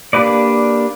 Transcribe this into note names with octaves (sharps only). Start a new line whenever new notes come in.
A#3 D4 G4 B4 D5